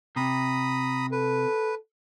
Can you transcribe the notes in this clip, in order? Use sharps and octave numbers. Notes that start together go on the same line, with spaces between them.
C3 A#5 B5 D#6
A4 B4